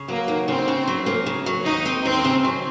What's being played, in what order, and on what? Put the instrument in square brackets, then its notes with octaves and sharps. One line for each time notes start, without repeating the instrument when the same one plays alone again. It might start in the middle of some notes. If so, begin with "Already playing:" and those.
Already playing: [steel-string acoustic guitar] C#3
[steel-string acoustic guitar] F#3 [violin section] A#3
[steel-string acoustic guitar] D#2
[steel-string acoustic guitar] C#3 [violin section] C4
[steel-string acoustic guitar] C#3
F#3
A#3
C#3
F#3
[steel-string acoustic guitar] D#2 [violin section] D#4
[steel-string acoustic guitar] C4
[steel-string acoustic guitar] D#2 [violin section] C4
[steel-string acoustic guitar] C#3
F#3